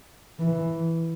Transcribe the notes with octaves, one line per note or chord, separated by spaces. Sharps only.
E3